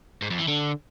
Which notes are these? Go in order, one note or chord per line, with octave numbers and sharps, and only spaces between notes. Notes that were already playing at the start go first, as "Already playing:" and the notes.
G#2
F2
E3
D3